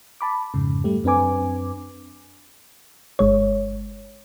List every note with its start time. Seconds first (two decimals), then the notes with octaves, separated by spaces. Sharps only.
0.21 A5 B5 D6
0.54 F2 G#2 C#3
0.84 G3 A3 G4
1.04 F#2 C4 D4 B4 G#5 D6
3.19 G1 G#3 C#5